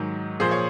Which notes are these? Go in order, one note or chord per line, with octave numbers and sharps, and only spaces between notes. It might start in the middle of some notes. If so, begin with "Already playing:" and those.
Already playing: G#2 D#3 F#3
A#2 F3 G#4 C5
C#5